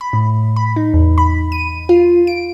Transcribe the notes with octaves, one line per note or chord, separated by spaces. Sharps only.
B5
A2
B5
D#4
E2
B5
D#7
F4
D7